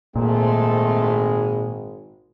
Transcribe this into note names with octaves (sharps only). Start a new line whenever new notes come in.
G#1 A#2 G#3 A3 C4 F4